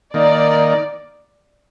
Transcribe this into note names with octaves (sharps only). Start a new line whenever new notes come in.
D#3 A#3 D#4 D5